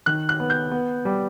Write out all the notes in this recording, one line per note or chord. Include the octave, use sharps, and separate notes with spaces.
D#3 F#6
F#6
B3
G6
B3
G3